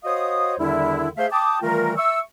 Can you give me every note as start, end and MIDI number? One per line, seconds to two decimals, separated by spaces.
0.05 0.55 66
0.05 0.55 72
0.05 0.55 73
0.05 0.55 75
0.05 0.55 77
0.05 0.55 87
0.59 1.09 40
0.59 1.09 50
0.59 1.09 51
0.59 1.09 55
0.59 1.09 62
0.59 1.09 64
1.17 1.27 57
1.17 1.27 68
1.17 1.27 72
1.17 1.27 76
1.17 1.27 77
1.32 1.59 79
1.32 1.59 81
1.32 1.59 86
1.32 1.59 87
1.63 1.97 51
1.63 1.97 52
1.63 1.97 55
1.63 1.97 57
1.63 1.97 65
1.63 1.97 70
1.97 2.20 76
1.97 2.20 85
1.97 2.20 88